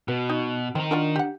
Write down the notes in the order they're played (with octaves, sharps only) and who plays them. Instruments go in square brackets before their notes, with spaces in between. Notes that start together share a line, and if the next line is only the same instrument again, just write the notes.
[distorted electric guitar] B2 [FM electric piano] F#4 [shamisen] B4
[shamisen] D#4
[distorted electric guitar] D#3 A#5 [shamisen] C4
[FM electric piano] D4 [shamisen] F4 F#4 A#4
[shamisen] G4 F#5